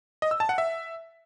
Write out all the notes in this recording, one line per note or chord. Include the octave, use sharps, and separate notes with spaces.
D#5
E6
A5
F#5
E5